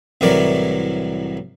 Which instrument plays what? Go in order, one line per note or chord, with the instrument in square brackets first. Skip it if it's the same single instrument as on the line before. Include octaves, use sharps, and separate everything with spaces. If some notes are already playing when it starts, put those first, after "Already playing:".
[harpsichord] C2 A2 E3 F#3 A#4 D5